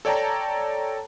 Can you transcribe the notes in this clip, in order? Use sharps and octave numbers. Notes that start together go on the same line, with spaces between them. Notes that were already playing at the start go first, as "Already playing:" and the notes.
A4 C#5 D5 G5 A5 A#5